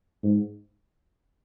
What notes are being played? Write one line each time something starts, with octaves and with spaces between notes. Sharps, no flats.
G#2